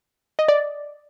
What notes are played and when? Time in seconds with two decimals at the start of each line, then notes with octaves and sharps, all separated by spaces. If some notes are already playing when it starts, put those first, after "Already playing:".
0.39 D#5
0.48 D5